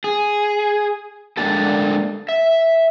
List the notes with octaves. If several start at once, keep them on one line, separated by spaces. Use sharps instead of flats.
G#4
G#3 A#3 D4 G4 A4
E5